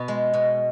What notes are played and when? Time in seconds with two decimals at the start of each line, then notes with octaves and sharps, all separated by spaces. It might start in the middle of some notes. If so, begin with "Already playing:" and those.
Already playing: B2 B3
0.08 G#3
0.33 B2